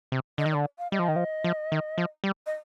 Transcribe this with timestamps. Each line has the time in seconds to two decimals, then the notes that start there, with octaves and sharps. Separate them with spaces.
0.12 C3
0.38 D3 D#5
0.46 D#3
0.52 D3 D5
0.78 F5
0.92 G3 D#5
0.99 F3
1.08 D#3
1.16 F3
1.44 F3
1.72 D#3
1.98 F3
2.24 G3
2.46 D#5